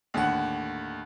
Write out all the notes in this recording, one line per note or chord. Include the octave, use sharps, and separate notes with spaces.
D#2 A2 D3 F#5